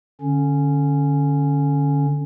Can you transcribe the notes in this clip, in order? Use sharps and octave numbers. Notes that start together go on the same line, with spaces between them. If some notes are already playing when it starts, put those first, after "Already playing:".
D3 C#4